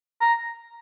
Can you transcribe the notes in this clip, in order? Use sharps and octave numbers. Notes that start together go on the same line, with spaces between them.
A#5